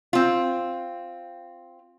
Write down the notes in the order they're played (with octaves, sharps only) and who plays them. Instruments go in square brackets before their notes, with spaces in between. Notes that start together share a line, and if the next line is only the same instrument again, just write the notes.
[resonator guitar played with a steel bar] C4 F4